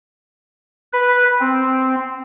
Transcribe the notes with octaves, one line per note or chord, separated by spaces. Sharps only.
B4
C4